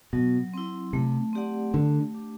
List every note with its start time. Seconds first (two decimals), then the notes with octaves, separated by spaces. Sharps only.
0.13 B2 F#3
0.54 C4 E4
0.93 C3 A3
1.33 C4 G4 D5 F#5
1.74 D3 A3
2.14 D4 G4